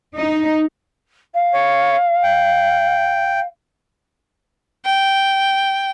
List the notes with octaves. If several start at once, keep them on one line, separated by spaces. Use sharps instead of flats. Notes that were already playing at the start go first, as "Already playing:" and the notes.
D#4
F5
C#5
G5
G5